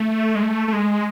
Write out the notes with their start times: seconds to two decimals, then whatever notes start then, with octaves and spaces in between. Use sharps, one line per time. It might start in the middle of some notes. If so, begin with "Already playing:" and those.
Already playing: A3
0.35 G#3
0.42 A3
0.68 A3
0.73 G#3